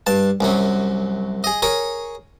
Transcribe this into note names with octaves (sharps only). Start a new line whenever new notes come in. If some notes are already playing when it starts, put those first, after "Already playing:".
G2 A5
C2 F#2 F#3
G#4 D#5
G#4 A#4 C#5 G#5